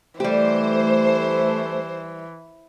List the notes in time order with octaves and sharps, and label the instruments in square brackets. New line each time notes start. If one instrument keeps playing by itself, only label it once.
[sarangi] E3 [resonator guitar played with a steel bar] G3 G4 [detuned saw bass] A3 [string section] C5